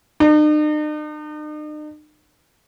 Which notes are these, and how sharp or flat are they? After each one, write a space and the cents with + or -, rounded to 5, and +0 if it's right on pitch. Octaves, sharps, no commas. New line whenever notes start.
D#4 -45